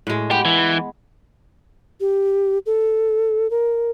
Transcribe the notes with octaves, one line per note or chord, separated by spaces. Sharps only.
A2 G#3
B3 G4
E3
G4
A4
A#4